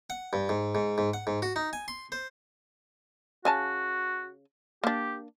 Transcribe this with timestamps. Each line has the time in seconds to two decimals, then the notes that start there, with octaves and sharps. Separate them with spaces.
0.10 F#5
0.33 G2
0.49 G#2
0.75 G#2
0.98 G#2
1.14 F#5
1.27 G#2
1.42 F#4
1.56 D#4
1.73 G#5
1.88 C6
2.12 C5
3.45 C#3 F#4 G#5 A5
4.84 A#3 D4 G4